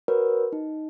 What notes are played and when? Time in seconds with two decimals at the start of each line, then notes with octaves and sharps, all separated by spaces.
0.08 F#4 A#4 B4 C#5
0.53 D#4